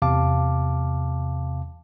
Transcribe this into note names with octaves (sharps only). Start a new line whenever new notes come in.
E2 C3 F5 A5 D6